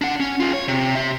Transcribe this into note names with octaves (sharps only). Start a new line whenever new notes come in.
D4 F#5
C#4
F4 G#4
C#5
C3
G4 E5